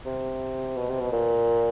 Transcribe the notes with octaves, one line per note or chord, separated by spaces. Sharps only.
C3
B2
C3
B2
A#2